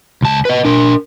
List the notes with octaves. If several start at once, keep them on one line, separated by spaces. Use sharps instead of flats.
C#2 A5
B4 D#5
D4 A#4